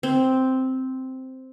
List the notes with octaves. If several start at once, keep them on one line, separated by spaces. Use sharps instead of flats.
C4